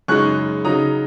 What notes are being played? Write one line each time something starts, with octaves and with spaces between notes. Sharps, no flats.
F#2 C#3 G#3 D#4 C#6 F#6
C#3 F#3 D#4 A#5 D#6